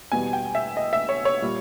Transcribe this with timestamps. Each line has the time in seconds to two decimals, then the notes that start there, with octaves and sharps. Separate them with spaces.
0.11 E2 B2 G3 G#5
0.33 G5
0.55 E5
0.77 D#5
0.93 E5
1.09 C#5
1.25 C#5
1.42 A#2 G3